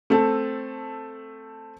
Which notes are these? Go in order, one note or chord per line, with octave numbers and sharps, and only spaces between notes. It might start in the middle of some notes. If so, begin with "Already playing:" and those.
A3 C4 A4